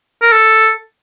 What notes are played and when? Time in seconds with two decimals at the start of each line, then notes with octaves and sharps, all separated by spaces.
0.22 A#4
0.32 A4